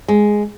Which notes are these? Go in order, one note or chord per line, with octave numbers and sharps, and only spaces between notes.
G#3